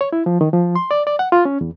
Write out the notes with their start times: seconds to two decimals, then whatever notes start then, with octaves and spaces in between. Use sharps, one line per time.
0.01 C#5
0.13 E4
0.26 F3
0.41 D#3
0.53 F3
0.76 C6
0.91 D5
1.07 D5
1.19 F#5
1.32 F4
1.45 C#4
1.61 E2